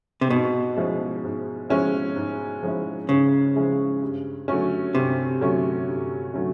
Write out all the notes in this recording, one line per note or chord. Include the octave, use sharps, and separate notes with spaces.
C3
G#2 B2
F3 G#3 C#4 E4
G#2
F3 G#3 C#4 E4
G#2
F3 G#3 C#4 E4
G#2 C#3
F3 G#3 C#4 E4
G2
D3 F#3 A3 C#4
G2 C3
D3 F#3 A3 C#4
G2
D3 F#3 A3 C#4